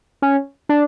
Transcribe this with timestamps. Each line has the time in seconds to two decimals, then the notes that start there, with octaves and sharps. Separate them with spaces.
0.22 C#4
0.69 D4